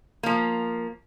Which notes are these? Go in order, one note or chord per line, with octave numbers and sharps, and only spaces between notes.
F3 A#3